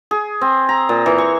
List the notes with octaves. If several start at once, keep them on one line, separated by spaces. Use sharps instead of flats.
G#4
C4
A#5
A#2
E3
C#6